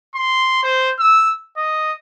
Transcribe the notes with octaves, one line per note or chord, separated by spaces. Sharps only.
C6
C5
E6
D#5